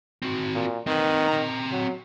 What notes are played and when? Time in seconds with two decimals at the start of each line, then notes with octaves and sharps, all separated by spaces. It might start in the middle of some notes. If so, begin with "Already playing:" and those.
0.22 C4 F#4
0.55 A#2
0.87 D#3 C4 B4
1.28 C4 A#5
1.72 F#3